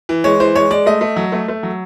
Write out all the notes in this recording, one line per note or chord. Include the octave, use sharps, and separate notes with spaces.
E3
G#3 C#5
E3 C5
G#3 C#5
G#3 D5
A3 D#5
A3
F#3
A3
A3
F#3